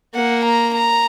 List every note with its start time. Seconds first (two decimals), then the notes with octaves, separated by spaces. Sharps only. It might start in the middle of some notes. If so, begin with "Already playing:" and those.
0.14 A#3 F#5
0.45 A#5
0.74 A#5